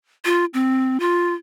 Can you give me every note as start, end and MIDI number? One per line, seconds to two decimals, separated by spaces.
0.25 0.45 65
0.54 1.00 60
1.00 1.34 65